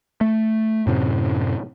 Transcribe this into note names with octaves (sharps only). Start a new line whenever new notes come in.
A3
F#2 A2 C3